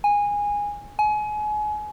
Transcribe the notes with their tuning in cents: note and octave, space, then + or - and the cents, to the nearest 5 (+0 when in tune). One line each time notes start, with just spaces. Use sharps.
G#5 -15
G#5 +30